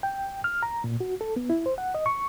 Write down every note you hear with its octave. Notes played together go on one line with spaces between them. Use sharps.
G5
F6
A#5
A#2
F#4
A4
B3
E4
C5
F#5
D#5
C#6